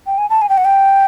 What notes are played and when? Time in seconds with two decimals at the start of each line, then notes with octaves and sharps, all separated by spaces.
0.07 G5
0.18 G#5
0.30 A5
0.42 G#5
0.49 G5
0.58 F#5
0.65 G5